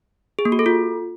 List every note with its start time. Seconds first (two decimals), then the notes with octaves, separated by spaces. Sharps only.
0.39 G#4
0.45 A#3
0.52 F#4
0.59 A4
0.66 F4